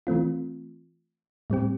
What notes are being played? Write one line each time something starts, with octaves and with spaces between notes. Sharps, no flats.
E3 A3 C4 F4
A2 G3 C4 G4